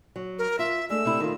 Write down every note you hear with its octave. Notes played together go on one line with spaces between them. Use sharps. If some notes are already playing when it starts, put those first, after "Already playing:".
F#3
A#4
F4 E5
G#3 A3 D4 E6
C3 E4
D#3 F4